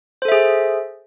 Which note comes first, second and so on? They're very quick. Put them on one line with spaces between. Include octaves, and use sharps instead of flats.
C5 A4 E5 G#4